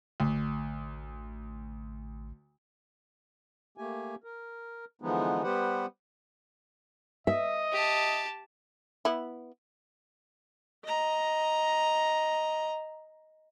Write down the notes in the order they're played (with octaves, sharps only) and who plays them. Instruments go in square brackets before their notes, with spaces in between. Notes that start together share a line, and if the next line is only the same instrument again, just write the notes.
[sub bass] A1 [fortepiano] D2
[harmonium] A3 A#3 G4 G#5
A#4
D3 E3 F3 G#3 B3 D#4
G3 B3 G4 B4 C5 F#5
[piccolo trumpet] D#5 [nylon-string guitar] E5
[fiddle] G4 A5
[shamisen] B3 E4
[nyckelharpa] D#5 A#5